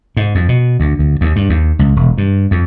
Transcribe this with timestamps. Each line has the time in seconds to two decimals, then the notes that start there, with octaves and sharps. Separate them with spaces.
0.17 G#2
0.35 F2
0.48 B2
0.80 D2
0.99 D2
1.21 D#2
1.36 G2
1.49 D#2
1.79 C#2
1.96 E1
2.18 G2
2.51 F2